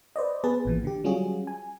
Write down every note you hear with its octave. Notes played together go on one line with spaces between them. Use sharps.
B4 C5 D5 D#5
B3 G#4 B4 A5
A1 A#2 E3
D3 G4
F#3 G3 C#4 F4 F#4 G#4
G#5